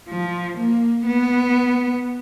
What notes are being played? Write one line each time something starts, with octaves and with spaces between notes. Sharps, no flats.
F3
A#3
B3